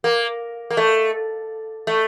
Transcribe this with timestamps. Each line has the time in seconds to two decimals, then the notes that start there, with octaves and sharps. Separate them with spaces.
0.04 A#3
0.70 A#3
0.77 A3
1.87 A3